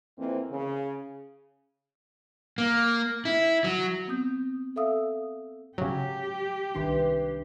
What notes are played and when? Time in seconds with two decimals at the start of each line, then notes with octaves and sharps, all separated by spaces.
0.18 F2 E3 A#3 C4
0.51 C#3
2.58 A#3
3.25 E4
3.64 F#3
4.07 B3 C4 D#6 G6
4.76 A4 E5 F5 D#6 E6
5.78 C#3 F#3 G4
6.75 C2 D#3 E3 D4 C6